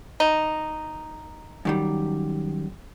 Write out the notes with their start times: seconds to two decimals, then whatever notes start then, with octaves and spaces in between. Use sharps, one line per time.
0.20 D#4
1.65 F#2 D#3 G3